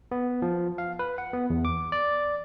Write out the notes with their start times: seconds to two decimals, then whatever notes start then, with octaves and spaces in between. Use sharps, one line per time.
0.11 B3
0.42 F3
0.78 F5
0.99 B4
1.18 F#5
1.33 B3
1.50 E2
1.65 D6
1.92 D5